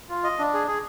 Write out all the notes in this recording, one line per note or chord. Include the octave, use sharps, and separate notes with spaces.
F4
D#5
D4
G#4
G#4